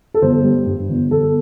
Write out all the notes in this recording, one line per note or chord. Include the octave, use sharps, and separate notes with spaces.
A4
G1 C5
G3
G2
G1
G1 A4